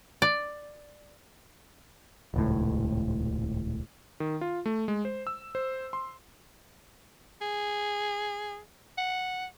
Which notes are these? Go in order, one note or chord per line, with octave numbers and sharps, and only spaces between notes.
D5
D#1 C#2 A2
D#3
F4
A3
G#3
C5
E6
C5
C6
G#4
F#5